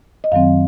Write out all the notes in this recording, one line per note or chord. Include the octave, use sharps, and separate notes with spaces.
D#5
F#2 D#3 F#3 C4 F5